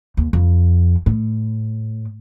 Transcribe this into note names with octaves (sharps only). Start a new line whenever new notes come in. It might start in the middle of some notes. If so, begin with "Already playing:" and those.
D#2
F2
A2